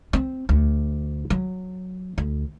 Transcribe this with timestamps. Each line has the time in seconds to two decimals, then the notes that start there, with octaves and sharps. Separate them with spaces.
0.13 C4
0.49 D2
1.30 F#3
2.18 D2